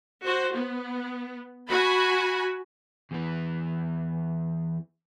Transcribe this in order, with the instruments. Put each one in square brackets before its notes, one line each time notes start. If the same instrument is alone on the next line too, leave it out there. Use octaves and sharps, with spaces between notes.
[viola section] F#4 C5
B3
F#4 G#5 B5
[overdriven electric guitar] E2 E3